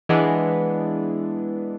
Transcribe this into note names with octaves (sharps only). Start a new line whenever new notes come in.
E3 G#3 B3 D4